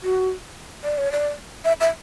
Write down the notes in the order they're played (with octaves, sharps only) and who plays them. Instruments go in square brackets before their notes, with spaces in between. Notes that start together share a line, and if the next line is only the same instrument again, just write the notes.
[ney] F#4
D5
C#5
D5
E5
E5